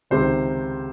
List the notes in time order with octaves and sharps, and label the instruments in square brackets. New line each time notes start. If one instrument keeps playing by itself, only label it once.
[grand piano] C#2 C3 D#3 C5